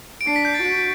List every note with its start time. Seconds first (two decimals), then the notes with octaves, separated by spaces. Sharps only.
0.21 D7
0.27 D4 C7
0.36 B6
0.45 G6
0.55 A6
0.63 F#4